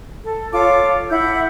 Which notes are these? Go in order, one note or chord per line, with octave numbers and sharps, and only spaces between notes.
A4
F4 A4 C#5 D6
E4 F#5 G6